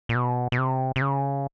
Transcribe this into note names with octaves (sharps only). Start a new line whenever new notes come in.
A#2
B2
B2
C3
C3
C#3